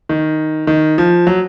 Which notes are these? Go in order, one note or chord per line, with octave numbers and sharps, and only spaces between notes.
D#3
D#3
F3
F#3